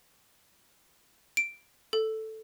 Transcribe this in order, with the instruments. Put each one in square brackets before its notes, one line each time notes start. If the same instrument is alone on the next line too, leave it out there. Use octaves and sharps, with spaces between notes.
[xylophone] D7
A4